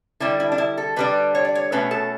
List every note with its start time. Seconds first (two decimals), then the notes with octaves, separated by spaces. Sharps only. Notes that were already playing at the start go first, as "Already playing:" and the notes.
0.20 D3 G3 D4 E4
0.40 E4
0.52 D4
0.58 E4
0.78 A4
0.96 D3 G3 D4 B4
1.35 C#5
1.45 D5
1.55 C#5
1.72 B2 A3 C#4 B4
1.91 A4